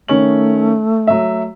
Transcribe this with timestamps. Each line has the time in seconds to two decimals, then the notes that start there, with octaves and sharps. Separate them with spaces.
0.08 D#3 A3 C#4 F#7
1.07 F#3 E5